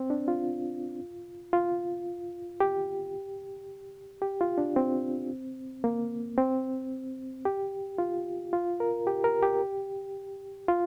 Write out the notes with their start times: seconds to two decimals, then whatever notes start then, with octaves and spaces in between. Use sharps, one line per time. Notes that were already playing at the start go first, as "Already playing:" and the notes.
Already playing: C4
0.10 D4
0.28 F4
1.53 F4
2.60 G4
4.22 G4
4.41 F4
4.58 D4
4.76 C4
5.84 A#3
6.38 C4
7.45 G4
7.98 F4
8.53 F4
8.80 A#4
9.07 G4
9.24 A#4
9.42 G4
10.69 F4